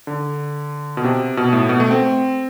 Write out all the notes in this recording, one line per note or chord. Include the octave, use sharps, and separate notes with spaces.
D3
B2
C3
B2
A2
B2
A3
C4